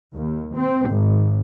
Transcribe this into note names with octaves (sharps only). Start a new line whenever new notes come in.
D#2
C4
G#1